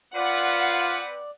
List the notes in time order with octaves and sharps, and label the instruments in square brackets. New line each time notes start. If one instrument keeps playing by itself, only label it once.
[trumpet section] C4 B4 [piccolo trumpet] F4 [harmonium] D5 [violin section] F#5